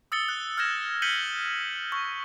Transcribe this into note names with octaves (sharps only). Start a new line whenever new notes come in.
D#6 E6 A6 C#7 G7
F#6
F6 F#6 G#6 A#6 E7
G6 B6 C#7 D#7 F#7 G7
C#6